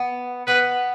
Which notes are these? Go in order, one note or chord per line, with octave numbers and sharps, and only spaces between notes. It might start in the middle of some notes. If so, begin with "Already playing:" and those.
Already playing: B3
B3 B4